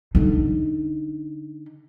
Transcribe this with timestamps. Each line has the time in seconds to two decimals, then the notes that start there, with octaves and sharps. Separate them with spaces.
0.15 D3 D#4